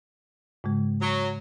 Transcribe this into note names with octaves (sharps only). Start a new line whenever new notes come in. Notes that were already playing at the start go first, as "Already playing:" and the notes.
G#2 C#3 G#3
F#3